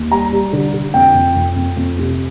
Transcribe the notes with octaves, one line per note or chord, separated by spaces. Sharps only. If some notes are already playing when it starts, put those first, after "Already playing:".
Already playing: D#2
G3 A#5
G3
D3
D3
F2 G5
F2
F2
F2
F2
C3